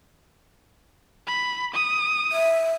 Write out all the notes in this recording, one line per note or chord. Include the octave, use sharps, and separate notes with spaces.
B5
D#6
E5